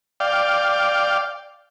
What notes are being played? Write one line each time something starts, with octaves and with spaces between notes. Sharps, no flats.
D5 F5 G5